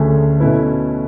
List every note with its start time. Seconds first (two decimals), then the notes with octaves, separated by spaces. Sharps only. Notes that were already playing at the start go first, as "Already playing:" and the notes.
Already playing: D2 D3 A3 C#4 G#4
0.40 B2 A3 C#4 E4 B4